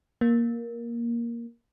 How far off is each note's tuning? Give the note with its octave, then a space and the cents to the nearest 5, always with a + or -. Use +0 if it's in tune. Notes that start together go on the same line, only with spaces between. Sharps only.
A#3 +10